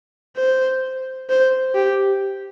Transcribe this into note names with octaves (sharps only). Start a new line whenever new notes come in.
C5
C5
G4